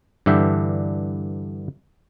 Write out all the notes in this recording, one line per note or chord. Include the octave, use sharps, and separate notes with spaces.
G2 D3 E3 D4 E5 G5